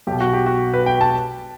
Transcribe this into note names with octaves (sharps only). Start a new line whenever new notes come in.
B1 B2 G4
F#4
G4
F#4
B4
G5
A5